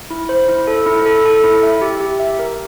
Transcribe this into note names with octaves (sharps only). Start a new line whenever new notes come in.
E4
C5
E4
A4
E4
A4
A4
E4
E5
G4
G4
E5
A#4